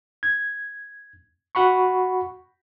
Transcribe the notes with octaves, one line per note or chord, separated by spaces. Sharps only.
G#6
F#4 F#5 B5 C#6